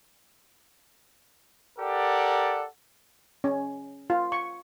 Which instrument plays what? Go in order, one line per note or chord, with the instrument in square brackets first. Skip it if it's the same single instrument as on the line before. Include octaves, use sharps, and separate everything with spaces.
[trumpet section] G4 A4 A#4 D5 F#5
[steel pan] C#4
F4
C#6